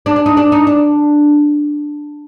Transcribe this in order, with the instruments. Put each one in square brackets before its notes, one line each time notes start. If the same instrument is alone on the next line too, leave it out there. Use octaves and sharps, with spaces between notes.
[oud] D4
D4
D#4
D4
D#4
D4